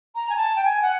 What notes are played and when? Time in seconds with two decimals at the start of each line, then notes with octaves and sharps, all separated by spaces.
0.15 A#5
0.29 G#5
0.37 A5
0.56 G5
0.65 G#5
0.82 F#5